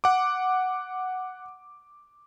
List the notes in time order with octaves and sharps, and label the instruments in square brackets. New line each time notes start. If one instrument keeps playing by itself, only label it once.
[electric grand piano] F#5 D6